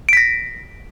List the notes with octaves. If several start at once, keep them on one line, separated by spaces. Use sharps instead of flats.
A#6 B6 D7